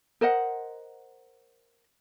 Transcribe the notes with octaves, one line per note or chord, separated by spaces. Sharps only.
A#4 C5 D#5 F#5